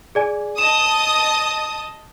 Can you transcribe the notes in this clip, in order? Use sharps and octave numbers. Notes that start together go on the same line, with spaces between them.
G#4 D5 G#5
D#5 A5 D#6 E7